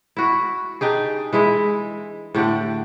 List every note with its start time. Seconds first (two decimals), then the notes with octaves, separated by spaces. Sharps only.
0.17 E4 F#4
0.81 D4 D#4 G4 G#4
1.33 E3 G#3 E4
2.35 A2 D3 G4 F#5